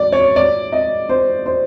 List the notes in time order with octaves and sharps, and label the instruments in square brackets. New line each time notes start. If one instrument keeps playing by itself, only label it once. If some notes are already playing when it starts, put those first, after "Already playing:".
Already playing: [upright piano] D5
C#5
D5
D#5
C5
C5